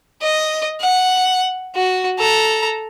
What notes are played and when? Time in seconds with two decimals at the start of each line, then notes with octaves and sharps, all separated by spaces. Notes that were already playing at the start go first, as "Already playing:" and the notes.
0.22 D#5
0.80 F#5
1.76 F#4
2.18 A4 A#5